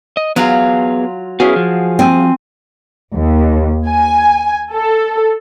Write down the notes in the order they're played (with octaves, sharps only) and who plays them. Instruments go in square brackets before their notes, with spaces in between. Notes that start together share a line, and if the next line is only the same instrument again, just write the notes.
[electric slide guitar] D#5
[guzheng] F#3 F4 [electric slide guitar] B3 G#4
[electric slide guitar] B3 C#4 E4 [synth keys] F#4 G#4 F5
[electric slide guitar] F3
[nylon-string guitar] C4 G#5
[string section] D#2
G#5
A4